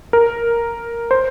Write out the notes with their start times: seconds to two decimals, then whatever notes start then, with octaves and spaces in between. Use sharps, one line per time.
0.13 A#4
1.11 C5